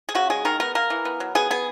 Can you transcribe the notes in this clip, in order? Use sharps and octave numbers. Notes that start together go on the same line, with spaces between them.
G#4
C#3 F#4
G#3 G#4
D#3 A#4
B3 A#4
A#3 A#4
E3
B3
F#3
B3 G#4
B3 G#4